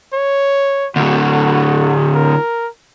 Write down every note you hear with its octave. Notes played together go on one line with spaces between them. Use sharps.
C#5
D2 A2 F#4
A#4